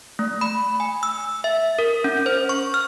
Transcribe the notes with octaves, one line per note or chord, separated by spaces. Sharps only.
A3
B5
G#5
E6
E5
A#4
C#4
C5
C#6
F6